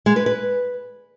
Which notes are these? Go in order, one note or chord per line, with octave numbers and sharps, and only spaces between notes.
G#3
B4
B4